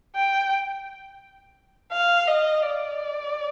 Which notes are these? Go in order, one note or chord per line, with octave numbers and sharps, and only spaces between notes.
G5
F5
D#5
D5